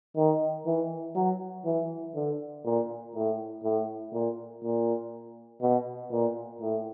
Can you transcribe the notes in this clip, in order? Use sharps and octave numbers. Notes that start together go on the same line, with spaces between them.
D#3
E3
F#3
E3
D3
A#2
A2
A2
A#2
A#2
B2
A#2
A2